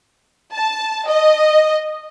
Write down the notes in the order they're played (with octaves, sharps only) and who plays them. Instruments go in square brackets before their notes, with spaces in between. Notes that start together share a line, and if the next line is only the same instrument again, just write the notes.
[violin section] A5
D#5